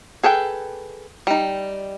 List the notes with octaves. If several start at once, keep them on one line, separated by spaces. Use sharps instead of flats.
G#4 A4 B4 G5
G3 D#4